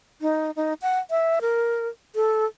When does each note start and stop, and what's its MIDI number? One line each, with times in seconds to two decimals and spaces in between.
0.22 0.51 63
0.56 0.73 63
0.82 0.99 78
1.11 1.39 76
1.41 1.89 70
2.15 2.45 69